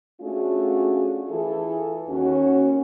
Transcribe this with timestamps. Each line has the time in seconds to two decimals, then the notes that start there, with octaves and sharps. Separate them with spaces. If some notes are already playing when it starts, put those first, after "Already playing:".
0.21 A3 C#4 D4 F4 F#4 G#4
1.29 E3 E4 F4 G#4 A4
2.09 D#2 C#4 F#4